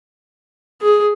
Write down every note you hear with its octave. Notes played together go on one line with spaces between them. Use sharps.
G#4